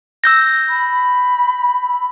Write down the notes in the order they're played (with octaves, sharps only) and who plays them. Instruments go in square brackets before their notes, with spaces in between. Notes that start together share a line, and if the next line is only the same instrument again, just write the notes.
[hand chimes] E6 G6 A#6
[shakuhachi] B5